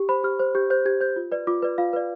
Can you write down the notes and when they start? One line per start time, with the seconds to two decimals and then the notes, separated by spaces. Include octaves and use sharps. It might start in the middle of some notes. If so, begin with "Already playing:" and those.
Already playing: G4
0.09 C5 B5
0.24 G4 F6
0.39 C5
0.55 G4 G6
0.70 C5 G6
0.86 G4 G#6
1.01 C5 G6
1.16 F4
1.32 B4 D5
1.47 F4 D6
1.62 B4 D5
1.78 F4 F5
1.93 B4 D5